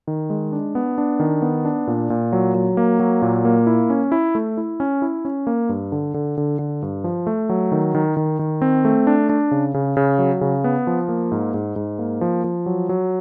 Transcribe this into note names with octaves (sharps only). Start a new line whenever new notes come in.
D#3
G#3
D4
B3
D4
D#3
B3
D4
A#2
A#2
F#3
F#3
A#3
F#3
A#2
A#3
E4
C#4
E4
A3
E4
C#4
E4
C#4
A#3
G2
D3
D3
D3
D3
G2
F3
A3
F#3
D#3
D#3
D#3
D#3
C4
A3
D4
D4
C#3
C#3
C#3
F#3
C#3
B3
F3
A#3
G#2
G#2
G#2
A#3
F3
F3
F#3
F#3